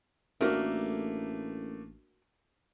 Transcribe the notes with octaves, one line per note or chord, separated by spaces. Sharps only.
A1 A3 A#3 D4 F#4 A#4